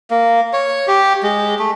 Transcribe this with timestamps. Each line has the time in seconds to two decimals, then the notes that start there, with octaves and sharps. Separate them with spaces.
0.10 A#3
0.53 C#5
0.88 G4
1.23 G#3
1.59 A3